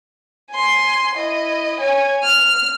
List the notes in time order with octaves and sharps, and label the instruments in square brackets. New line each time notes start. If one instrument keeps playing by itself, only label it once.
[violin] G#5 C6
E4 D#5
C#5 G#5
F6